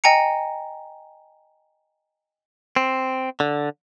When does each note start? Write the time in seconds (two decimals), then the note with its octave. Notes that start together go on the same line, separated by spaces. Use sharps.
0.04 D#5 G5 G#5 A#5 C#7
2.76 C4
3.40 D3